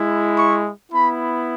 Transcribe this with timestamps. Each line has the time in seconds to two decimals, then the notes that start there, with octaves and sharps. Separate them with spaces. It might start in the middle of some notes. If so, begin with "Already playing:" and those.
Already playing: G#3 E4
0.38 C#6
0.92 B3 E4 B5